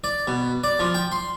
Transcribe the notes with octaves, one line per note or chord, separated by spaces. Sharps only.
D5
B2
D5
F3
G5
C6